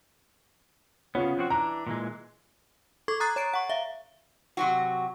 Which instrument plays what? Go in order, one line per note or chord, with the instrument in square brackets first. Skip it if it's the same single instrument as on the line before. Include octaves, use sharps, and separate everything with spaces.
[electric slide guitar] C#3 B3 [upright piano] C#4 F4
[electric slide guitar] F3 C4 F#4
[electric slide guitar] E3 D4 [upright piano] A#5
[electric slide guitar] A#2 E3 G#3
[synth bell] A4 C#6 D6 G#6
A#5 D#6 F#6 A6 C7
C#5 A#5 D7
F#5 C#6
E5 F5
[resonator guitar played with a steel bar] C3 F#3 F#4